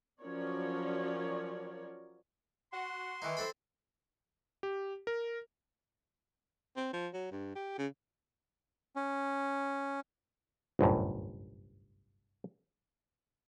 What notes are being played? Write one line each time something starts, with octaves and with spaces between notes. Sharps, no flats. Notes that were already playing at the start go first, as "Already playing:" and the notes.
F3 F#3 C#4 A#4 C#5 D5
F#4 C6
D#3 E3 D#4
C4 A4 B5
G4
A#4
C4
F3
F#3
G2
G4
C#3
C#4
G1 C2 F#2 A2